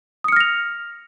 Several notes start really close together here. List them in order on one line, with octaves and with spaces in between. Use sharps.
D#6 C#7 F6 A#6 F7